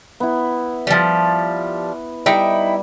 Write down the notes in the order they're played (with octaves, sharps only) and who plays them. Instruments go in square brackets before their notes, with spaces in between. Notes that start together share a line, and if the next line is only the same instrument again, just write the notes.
[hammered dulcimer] B3 E4
[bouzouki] F3 G3
[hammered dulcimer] G3 [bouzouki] D#4 E4 G5